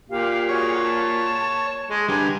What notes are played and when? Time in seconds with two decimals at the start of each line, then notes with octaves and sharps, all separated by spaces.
0.10 A#2 G4 F5
0.49 F#4 G#4 C#5 F#5
0.82 A5
1.90 G#3
2.09 G2 D3 G3 G#5 A#5